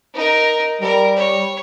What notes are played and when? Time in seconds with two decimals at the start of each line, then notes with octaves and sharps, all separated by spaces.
0.14 D#4 A#4
0.81 G3 A#4
1.16 C#5